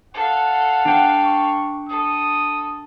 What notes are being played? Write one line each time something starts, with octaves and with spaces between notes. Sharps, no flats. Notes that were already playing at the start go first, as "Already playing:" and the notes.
A4 F5 F#5
D4 G5
C#6
A4 D#6